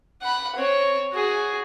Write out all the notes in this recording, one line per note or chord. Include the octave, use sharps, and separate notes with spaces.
F#5 B5
C4 C#5
F#4 G#4